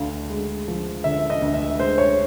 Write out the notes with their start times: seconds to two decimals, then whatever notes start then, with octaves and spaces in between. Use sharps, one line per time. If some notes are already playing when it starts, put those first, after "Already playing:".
Already playing: D2 D3 F5
0.30 G#3
0.68 F3
1.04 D3 E5
1.30 D#5
1.42 D2
1.54 E5
1.79 G#3 C5
1.98 C#5